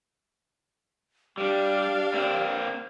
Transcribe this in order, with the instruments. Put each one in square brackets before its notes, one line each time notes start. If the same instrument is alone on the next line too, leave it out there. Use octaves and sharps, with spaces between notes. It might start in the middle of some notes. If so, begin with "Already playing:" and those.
[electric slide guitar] G3 [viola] D4 F5 [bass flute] G4
[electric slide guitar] A#3 C4